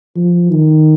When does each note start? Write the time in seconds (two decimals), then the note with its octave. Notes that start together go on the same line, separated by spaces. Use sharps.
0.16 F3
0.52 D#3